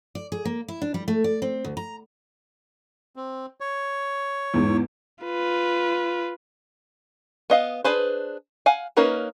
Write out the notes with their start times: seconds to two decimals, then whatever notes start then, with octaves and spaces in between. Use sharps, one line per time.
0.15 D5
0.32 G#4
0.45 A#3
0.68 E4
0.82 D4
0.94 G3
1.08 A3
1.24 D5
1.42 C4
1.65 D2
1.77 A#5
3.16 C4
3.60 C#5
4.54 E2 G#2
5.25 F4 B4
7.50 B3 D#5 F5
7.84 D4 G#4 B4 C5
8.66 F5 F#5 G#5
8.97 A#3 C#4 D#4 A#4 B4